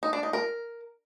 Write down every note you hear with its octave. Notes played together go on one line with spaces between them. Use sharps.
D#4
D4
D#4
A#4